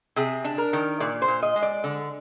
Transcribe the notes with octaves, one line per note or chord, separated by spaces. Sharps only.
C3 G#4
D4
A#4
D#3
A#2 D5
C5
A#2
D#5
G#3
D5
D3